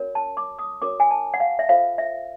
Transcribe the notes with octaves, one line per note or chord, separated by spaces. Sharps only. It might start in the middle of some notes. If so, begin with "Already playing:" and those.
Already playing: C#4 F#4 A#4 C#5
A5
D6
D#6
C#4 F#4 A#4 C#5 D6
G#5
A5
F#5
F5
E5
F4 A4 C5 F5
E5